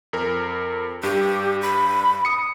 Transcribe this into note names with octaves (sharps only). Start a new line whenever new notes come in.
F2 A#4
G2 G4
B5
D#6 C#7